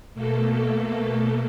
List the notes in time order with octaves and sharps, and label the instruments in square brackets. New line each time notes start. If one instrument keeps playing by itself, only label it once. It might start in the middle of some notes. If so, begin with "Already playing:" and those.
[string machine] B2 A3 A#3 A4